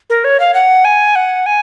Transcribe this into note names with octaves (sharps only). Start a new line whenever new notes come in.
A#4
C#5
F5
F#5
G#5
F#5
G#5